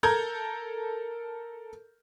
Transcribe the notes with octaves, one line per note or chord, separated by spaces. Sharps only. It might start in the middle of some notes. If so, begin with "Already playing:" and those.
A4 A#4 A#5 G6 G#6